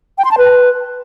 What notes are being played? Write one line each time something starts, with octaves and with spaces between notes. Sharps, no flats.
G5
C6
A5
B4